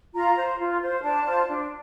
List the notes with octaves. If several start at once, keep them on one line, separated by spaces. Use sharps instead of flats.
F4 A#5
C5
F4
C5
D4 A5
F4 C5
D4